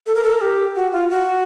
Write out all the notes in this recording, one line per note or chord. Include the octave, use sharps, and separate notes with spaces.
A4
A#4
A4
A#4
G4
F#4
F4
F#4